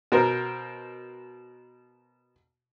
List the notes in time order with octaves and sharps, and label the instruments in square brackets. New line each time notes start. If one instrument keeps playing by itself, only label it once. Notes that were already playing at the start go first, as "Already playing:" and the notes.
[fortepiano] B2 A#4 C5